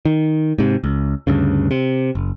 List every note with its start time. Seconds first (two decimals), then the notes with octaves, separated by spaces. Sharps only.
0.05 D#3
0.58 G#2 C3
0.84 C#2
1.27 D2 G2 C#3
1.71 C3
2.15 F#1